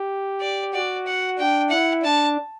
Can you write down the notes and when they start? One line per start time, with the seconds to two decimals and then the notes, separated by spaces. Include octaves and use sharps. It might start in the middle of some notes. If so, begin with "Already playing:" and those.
Already playing: G4
0.41 D5
0.74 F#4 D5
1.06 F#5
1.38 D4 G5
1.70 E4 F#5
2.03 D4 A5